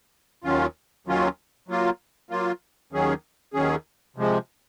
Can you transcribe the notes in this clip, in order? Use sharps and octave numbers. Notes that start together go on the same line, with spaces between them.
D#2 D#3 F#3 C#4 F4
D#2 D#3 F#3 C#4 F4
F#3 A#3 F4
F#3 A#3 F4
D#2 D#3 F#3 C#4 G#4
D#2 D#3 F#3 C#4 G#4
C3 F3 G#3